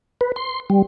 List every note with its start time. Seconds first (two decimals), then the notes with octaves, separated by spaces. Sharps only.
0.21 B4
0.36 C6
0.70 G3